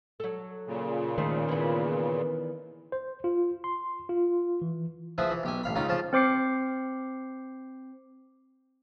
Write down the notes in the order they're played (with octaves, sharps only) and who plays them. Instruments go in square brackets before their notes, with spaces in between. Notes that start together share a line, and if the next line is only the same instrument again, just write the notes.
[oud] F#3 A4
[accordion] A#2 C#3
[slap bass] D#3 [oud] A3 C5
[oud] E3 B3
[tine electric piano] C5
F4
C6
F4
E3
[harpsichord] F3 E4 G#4 B4
E3
B1 G4 G#5
A1 F5 B5
C#2 C#3 D#4 F4 B5
C#3 F3 F4 A5
[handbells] C4 C5 D6 C7 C#7